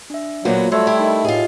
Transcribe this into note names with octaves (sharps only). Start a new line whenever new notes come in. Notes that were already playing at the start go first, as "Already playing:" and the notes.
D4 E5
A#2 F#3 A#3 B3 F4 F#4 C5
F#3 G3 A3 C6 E6 G#6
E4 G4
D#4 A#4 D#5
A2 F4 G4 G#4 D#5